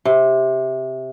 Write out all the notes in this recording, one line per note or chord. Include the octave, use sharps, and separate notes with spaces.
C3